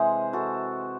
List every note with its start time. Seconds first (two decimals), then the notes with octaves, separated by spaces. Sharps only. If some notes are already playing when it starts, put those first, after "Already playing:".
Already playing: C3 E3 G#3 G#4 C5
0.33 F#4 A4